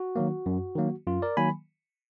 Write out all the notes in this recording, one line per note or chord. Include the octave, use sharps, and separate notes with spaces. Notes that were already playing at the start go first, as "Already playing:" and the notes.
Already playing: F#4
D#3 F#3 A#3
F#2
D#3 F#3 A#3
F#2 F4
A#4 D5
D#3 F#3 A#3 G#5 B5